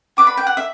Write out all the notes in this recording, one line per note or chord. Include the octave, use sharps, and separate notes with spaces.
F#4 B4 D5 D6
B5
G5
F#5
E5